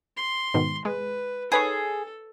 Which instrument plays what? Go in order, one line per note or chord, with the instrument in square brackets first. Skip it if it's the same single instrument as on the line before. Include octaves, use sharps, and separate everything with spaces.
[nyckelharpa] C6
[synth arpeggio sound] G#2 B2 D#3
[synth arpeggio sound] G#3 [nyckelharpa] B4
[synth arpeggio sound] D#4 B4 C#5 [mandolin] G#4 [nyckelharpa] A4